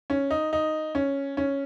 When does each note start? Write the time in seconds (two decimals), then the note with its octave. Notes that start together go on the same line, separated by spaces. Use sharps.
0.10 C#4
0.30 D#4
0.53 D#4
0.95 C#4
1.37 C#4